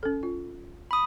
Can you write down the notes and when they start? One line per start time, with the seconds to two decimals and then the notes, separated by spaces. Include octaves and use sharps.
0.03 C#4 A4
0.23 F4
0.91 B5 D#6